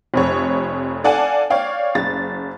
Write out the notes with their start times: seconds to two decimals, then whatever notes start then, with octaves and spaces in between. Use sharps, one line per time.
0.14 F1 F2 C#5
1.04 A4 D5 F5 F#5 G#5 A5
1.50 C#5 D5 F5 G5
1.95 F#1 A6